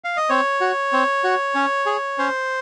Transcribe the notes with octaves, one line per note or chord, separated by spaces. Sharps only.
F5
D#5
C4 C#5
F#4
C4
F#4
C#4
G#4
C#4 C5